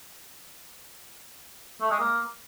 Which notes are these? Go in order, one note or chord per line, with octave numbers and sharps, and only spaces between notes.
A3
G#3
A#3